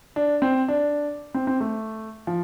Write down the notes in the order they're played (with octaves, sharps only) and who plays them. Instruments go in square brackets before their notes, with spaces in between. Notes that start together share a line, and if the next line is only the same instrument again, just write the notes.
[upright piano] D4
C4
D4
C4
C4
A3
F3